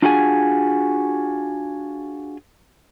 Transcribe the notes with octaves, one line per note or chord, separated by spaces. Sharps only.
D4 F4 F#4 G#4 F#5 G#5